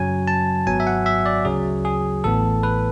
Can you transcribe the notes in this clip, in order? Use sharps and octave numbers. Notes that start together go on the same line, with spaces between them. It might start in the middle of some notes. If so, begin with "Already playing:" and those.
Already playing: F#2 C#3 F#3 G#5
A5
G#1 G#2 F#3 B3 G#5
E5
F#5
E5
D5
D2 C#3 F#3 G#4
G#4
A1 A2 E3 B3 A4
B4